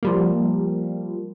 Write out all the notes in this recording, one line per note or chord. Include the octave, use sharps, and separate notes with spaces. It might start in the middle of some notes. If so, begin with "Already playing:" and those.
F3 G3 A#3